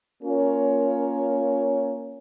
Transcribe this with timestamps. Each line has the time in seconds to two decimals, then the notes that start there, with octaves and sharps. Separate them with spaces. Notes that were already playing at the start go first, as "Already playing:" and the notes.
0.23 A#3 C#4 F4 A#4 C#5